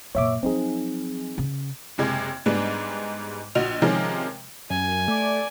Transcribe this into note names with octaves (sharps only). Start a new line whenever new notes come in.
F#2 A#2 C#5 E5 D6
F3 F#3 C4 D#4 G#4
C#3
F#1 C3 G#3 G#6
G#2 G3 G#3 B3 D4
A#1 F#4 D#5 F7
C3 D#3 F3 G#3 C#4 A#4
F#2 G#5
A3 D5